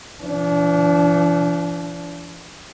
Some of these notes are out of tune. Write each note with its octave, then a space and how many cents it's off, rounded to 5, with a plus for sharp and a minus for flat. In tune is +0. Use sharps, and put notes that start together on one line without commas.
E3 +45 D4 -30